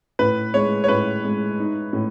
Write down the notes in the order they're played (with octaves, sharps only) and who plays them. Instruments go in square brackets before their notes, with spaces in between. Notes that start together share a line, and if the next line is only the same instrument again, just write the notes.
[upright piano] A2 [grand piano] B4
[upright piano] G#3 [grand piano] C#5
[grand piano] C#5
[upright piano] A2 [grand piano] B4
[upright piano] G#3
D#4
A2